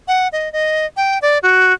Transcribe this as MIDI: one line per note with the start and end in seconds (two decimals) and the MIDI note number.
0.08 0.28 78
0.33 0.51 75
0.53 0.86 75
0.97 1.18 79
1.22 1.38 74
1.43 1.73 66